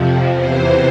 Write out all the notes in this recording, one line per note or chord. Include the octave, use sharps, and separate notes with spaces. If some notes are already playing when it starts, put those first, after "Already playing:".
Already playing: F2 C3 F3
E2 C3 E3 C5